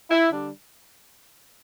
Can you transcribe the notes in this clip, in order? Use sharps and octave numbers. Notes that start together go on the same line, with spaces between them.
E4
D3 G3 D4